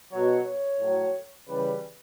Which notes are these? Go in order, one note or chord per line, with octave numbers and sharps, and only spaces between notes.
B2 F#3 C#5
C#5
A2 F#3
C#3 E3 G3 B4